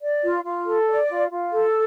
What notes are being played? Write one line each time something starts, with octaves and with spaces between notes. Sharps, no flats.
D5
F4
F4
A4
D5
F4
F4
A4